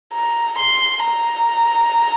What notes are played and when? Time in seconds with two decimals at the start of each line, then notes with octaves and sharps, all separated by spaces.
0.13 A#5
0.59 C6
1.05 A#5